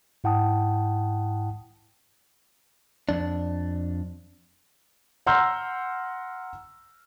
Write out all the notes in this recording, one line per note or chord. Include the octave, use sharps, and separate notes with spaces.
G#2 E4 F#5 G5 A5 D#6
F2 D4
F#5 A#5 C6 E6 F6 G6